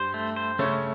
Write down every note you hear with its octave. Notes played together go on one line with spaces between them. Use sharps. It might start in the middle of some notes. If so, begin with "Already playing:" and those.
Already playing: G2 G3 C5
A3
C5
C#3 A3 C#4